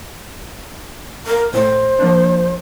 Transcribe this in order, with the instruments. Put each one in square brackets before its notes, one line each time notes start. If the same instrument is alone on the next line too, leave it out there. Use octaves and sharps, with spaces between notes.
[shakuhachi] A#4
[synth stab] A2 [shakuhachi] C5
[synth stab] F3 A#3 D4